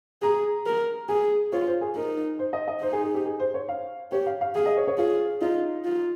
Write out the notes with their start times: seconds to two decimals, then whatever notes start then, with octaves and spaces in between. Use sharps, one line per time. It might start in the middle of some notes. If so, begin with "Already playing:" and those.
0.22 G#4 A#5
0.66 A#4
1.09 G#4 G#5
1.52 F4 C#5
1.67 C5
1.81 G#4
1.96 D#4 A#4
2.39 C5
2.53 D#5
2.68 D#5
2.82 D#4 C5
2.93 G#4
3.04 G#4
3.14 G4
3.26 G#4
3.40 C5
3.54 C#5
3.69 F5
4.12 G4 C#5
4.26 F5
4.41 F5
4.55 G#4 F5
4.66 D#5
4.77 C#5
4.87 C#5
4.98 F4 G#4
5.41 D#4 F4
5.85 F4